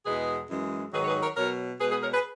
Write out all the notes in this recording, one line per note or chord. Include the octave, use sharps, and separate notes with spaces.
E2 B2 G#3 G#4 B4
F#2 E3 G#3
G#2 D#3 F#3 G#4 B4
C#5
G#4 B4
A#4 C#5
B2 F#3 A#4 C#5
B2 G#3 G#4 B4
G#4 B4
A#4 C#5
G#4 B4